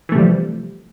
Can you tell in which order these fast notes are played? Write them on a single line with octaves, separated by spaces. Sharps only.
E3 A3 C3 G3 F3